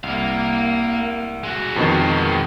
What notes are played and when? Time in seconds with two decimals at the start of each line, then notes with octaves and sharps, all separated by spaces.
0.03 C2 A#3 F5
1.43 G#3 F#4
1.76 F2 B2 D#3